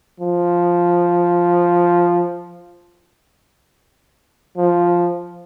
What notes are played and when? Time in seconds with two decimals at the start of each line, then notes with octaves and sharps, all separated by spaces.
0.20 F3
4.57 F3